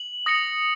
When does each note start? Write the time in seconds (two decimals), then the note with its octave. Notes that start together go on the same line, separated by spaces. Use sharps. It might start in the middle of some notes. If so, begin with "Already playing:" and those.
Already playing: F#7
0.26 D#6 A#6 C#7 F#7